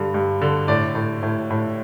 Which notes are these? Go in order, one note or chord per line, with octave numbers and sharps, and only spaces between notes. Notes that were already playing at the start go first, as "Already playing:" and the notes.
Already playing: G2 D3
G2
D3
A2 D5
A2
A2
A2